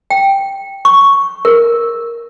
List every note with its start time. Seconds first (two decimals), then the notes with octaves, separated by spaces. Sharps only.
0.10 G5
0.85 C#6
1.45 A#4